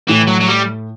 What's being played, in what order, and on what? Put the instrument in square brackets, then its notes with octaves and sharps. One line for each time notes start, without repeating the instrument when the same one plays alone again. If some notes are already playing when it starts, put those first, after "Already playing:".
[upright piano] A2 [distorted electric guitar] E3
[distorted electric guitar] F#3
F#3
G3